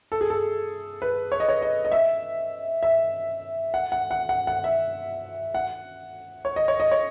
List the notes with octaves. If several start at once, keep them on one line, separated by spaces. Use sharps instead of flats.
A4
G#4
A4
B4
C#5
D#5
C#5
D#5
D#5
E5
E5
F#5
F#5
F#5
F#5
F#5
E5
F#5
C#5
D#5
C#5
D#5
C#5